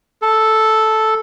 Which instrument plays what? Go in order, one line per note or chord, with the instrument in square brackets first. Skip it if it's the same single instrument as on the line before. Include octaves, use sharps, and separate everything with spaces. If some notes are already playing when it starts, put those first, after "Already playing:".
[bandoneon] A4